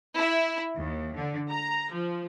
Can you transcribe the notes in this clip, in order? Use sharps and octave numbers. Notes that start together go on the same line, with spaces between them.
E4
D#2
D3
A#5
F3